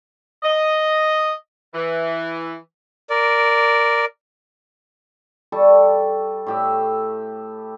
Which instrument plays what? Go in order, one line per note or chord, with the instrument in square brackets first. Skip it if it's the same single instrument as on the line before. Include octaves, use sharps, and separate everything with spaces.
[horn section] D#5
E3
[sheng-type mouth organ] A#4 D5
[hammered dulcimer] G3 A4 C#6
A2 G4 E5